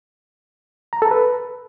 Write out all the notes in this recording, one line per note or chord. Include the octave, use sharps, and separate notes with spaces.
A#5
A4
B4